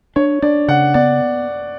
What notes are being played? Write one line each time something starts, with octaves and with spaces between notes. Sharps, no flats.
D4 C#5
D4 D5
C#3 F#5
B3 D5